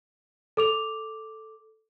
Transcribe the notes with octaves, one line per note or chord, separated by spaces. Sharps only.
A4 D6 F7